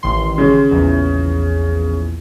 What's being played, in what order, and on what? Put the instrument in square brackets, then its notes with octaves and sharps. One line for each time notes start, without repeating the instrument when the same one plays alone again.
[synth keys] A1 D#3 C6
[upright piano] C#3
[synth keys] A#1 E2